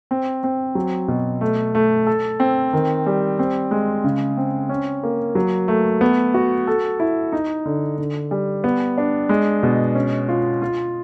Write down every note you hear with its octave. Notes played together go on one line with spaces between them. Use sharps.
C4
C4
F#3
B2
A3
A3
A4
C4
D#3
G3
C4
G#3
C#3
C4
C#4
A#3
F#3
A3
B3
F#4
A4
E4
D#4
D3
D3
G3
B3
D4
G#3
B2
C#4
F4
F4